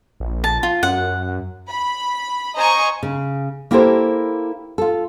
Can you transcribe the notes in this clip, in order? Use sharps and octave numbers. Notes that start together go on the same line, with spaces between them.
A#1
A5
F4
F#2 F#5
B5
C5 D#5 G#5 A#5 C#6
C#3
A#3 E4 G4 A4 A#4 C5
F4 A4